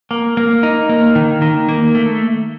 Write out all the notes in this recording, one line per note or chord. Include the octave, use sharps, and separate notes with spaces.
A#3
A#3
D#4
A#3
D#3
D#3
A#3
A3